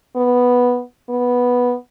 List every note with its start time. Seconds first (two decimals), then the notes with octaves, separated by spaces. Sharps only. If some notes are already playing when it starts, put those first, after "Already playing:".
0.16 B3
1.09 B3